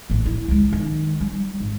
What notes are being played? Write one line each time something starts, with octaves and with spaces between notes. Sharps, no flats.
A1 A2
E4
C#2 G#3
D#3
G3
G#1